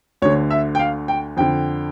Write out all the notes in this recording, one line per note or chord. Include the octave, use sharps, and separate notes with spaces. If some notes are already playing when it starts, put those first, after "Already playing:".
D2 D3 C#5
E5
G5
F5
G5
F2 D3 G5